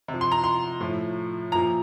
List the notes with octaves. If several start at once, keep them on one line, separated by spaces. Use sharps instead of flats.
C3
F3
C6
A#5
C6
A2 F3
A#2 F3 A#5